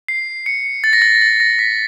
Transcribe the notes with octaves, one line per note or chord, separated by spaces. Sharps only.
C7
C#7
A6
A#6
A6
A6
A#6
B6